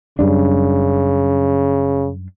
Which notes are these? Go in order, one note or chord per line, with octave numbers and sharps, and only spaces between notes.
F#2 C#3 G3 D4